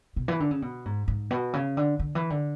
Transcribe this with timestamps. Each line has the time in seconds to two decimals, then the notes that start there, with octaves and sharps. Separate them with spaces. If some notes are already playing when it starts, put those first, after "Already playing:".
0.16 B2
0.28 E3
0.40 D3
0.51 C#3
0.62 B2
0.85 G#2
1.08 G#2
1.31 B2
1.53 C#3
1.77 D3
1.99 D3
2.15 E3
2.30 D3